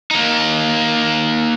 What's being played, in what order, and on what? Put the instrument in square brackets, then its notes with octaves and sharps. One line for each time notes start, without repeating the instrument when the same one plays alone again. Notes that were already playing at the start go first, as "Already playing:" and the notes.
[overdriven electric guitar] A#3 D#4